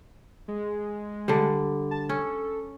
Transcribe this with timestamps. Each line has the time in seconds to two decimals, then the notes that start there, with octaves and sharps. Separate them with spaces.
0.48 G#3
1.28 D3 G3
1.91 A5
2.09 C#4 A4